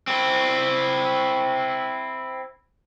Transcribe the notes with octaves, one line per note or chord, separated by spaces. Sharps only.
C4 E4